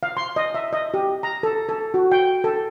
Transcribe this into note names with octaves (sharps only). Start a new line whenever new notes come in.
F5
C6
D#5
E5
D#5
G4
A#5
A4
A4
F#4
G5
A4